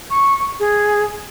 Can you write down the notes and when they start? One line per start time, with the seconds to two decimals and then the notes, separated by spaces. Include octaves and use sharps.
0.10 C#6
0.60 G#4